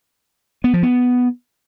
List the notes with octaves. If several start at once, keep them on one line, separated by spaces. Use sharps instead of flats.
B3
F3
B3